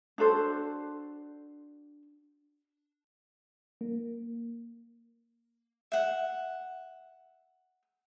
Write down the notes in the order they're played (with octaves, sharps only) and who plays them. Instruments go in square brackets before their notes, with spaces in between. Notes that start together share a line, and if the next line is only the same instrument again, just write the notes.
[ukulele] D4 F#4 A4 C5
[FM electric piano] A#3
[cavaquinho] E5 F#5